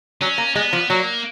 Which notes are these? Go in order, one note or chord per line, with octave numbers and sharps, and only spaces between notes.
F#3 C#4
A#3
G#3 B3
F3
F#3 A#3